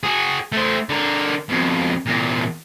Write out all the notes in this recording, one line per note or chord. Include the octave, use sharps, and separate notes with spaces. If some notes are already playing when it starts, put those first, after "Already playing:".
F#4 G#4
A3 C5
D3 A#4
F2 B2
E2 A#2